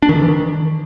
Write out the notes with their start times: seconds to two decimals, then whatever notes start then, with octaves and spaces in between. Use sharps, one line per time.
0.02 D4
0.09 D#3
0.15 D3
0.22 E3
0.28 D#3